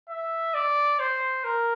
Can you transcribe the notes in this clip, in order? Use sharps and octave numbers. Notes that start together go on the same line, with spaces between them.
E5
D5
C5
A#4